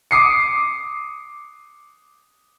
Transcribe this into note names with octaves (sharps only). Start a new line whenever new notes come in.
D6 D#6 C7 C#7